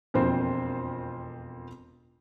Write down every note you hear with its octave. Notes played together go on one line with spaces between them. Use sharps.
E1 F2 A#3 C4 F4 C5